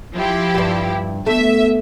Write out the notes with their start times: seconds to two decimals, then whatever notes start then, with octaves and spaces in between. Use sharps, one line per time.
0.15 F3 E4 G4
0.55 G2 G3
1.27 A3 B3 E5